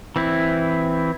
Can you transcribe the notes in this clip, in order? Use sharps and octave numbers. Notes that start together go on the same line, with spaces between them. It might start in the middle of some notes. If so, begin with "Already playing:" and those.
E3 C4 E4